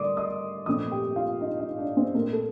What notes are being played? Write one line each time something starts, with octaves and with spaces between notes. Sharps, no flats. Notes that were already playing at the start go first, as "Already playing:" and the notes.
Already playing: G2 D3 A3 A#4 D5 C6 D6 D#6
D#5 D#6
A#2 F3 A3 C4 D#5 D#6
G4 G5
F4 F5
D#4 D#5
D#4 D#5
D4 D5
C4 C5
A#2 A3 A#3 C4 A#4
A4